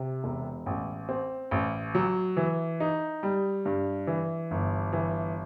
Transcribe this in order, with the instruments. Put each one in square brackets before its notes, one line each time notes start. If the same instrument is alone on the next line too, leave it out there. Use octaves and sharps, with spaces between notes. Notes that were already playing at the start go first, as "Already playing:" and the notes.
Already playing: [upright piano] C3
E1
A1
C4
A1
F#3
E3
D#4
G3
G2
E3
G1
E3